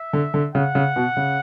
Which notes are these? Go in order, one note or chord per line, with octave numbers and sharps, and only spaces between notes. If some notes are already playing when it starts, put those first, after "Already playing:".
Already playing: E5
D3
D3
C#3 F#5
C#3
B2
C#3